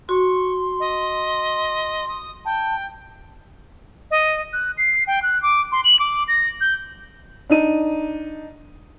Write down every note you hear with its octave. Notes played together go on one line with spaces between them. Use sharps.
F#4 C6 C#6
D#5
D#6
G5 A5
D#5
F#6
C7
G5
F#6
D6
C6
F#7
D6
A#6
G6
D4 D#4 D#7